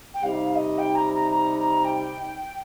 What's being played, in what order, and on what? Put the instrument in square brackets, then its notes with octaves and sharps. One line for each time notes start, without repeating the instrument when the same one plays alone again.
[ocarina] G5
[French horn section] C3 G3 D#4 [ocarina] F5
[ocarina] F5
D#5
G5
A#5
A#5
A#5
A#5
G5